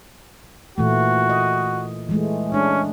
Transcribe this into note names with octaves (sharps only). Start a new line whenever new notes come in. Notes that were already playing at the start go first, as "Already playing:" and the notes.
A#2 E3 A3 F#4
D#5
E3 G#3 A3
G#3 C#4 D4